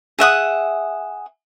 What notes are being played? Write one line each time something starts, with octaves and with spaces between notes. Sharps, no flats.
G#4 E5 F#5 D#6